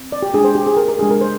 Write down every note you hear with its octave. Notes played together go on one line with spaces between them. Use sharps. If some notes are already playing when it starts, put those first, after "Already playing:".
Already playing: C4
D5
G4
G#3 D4 F4 G#4
C5
G4
G#4
A#4
A#4
G#3 D4 G4 G#4
A#4
C5